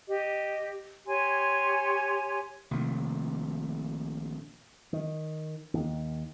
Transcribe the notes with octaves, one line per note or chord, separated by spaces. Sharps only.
G4 D#5
G4 C#5 G#5 C6
A#1 C3 D#3 A3
D#3
D#2